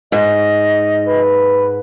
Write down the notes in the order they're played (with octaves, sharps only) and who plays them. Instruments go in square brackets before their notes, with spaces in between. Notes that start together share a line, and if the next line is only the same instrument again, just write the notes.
[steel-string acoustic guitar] G#2 [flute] D#5
[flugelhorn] B4